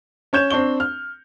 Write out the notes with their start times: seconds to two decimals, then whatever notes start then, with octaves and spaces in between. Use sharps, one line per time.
0.33 C#4 C#5 G6 E7
0.50 C4 D4 C#6 G7
0.80 F6